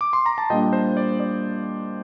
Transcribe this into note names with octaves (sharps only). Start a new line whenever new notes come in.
D6
C6
A#5
A5
A#2 G3 A#3 D4 D#5 G5
C5
D5
D5